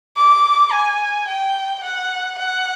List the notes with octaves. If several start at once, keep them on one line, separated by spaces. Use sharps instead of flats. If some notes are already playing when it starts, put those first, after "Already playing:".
D6
G#5
G5
F#5
F#5